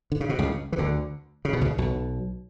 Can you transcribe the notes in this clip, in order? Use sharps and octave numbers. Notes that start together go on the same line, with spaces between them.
D3
C#3
B2
C#2 C#3
E3
D2 D3
C#3
B2
C#2 C#3
B1 B2